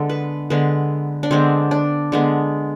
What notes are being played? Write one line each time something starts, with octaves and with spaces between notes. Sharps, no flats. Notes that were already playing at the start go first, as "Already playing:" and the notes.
Already playing: D3 G#3 B3 A4
B4
D3 G#3 B3 B4
D4
D3 G#3 B3 C4
D4
D3 G#3 B3